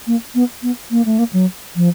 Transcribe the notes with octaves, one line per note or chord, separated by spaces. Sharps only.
A#3
B3
B3
A#3
A3
A#3
F#3
F3